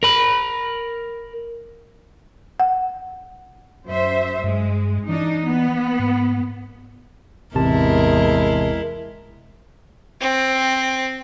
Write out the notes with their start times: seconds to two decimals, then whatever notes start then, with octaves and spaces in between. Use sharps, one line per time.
0.03 A#4 B5
2.60 F#5
3.87 F#2 C5 E5
4.44 G2 G#3
5.09 E3 D4 D#4
5.46 B3
5.99 G#2
7.55 A1 E2 C3 G#3 E4 A#4 A5
10.20 C4